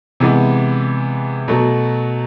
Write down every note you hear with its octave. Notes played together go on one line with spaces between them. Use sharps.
C3 E3 G#3 B3
B2 F#3 A3